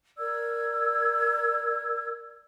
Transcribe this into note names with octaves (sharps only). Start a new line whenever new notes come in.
A#4 D5 E6 G#6